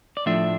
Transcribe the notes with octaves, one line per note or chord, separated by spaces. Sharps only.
D5
A2 F3 A3 D4 E5